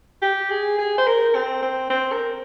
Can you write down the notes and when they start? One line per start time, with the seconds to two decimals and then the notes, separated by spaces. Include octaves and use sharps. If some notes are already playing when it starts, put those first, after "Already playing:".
0.22 G4
0.50 G#4
0.78 G#4
0.98 C5
1.07 A#4
1.35 C4
1.62 C4
1.90 C4
2.12 A#4